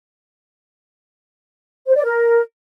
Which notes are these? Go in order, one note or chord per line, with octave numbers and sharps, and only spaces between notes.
C5
D5
A#4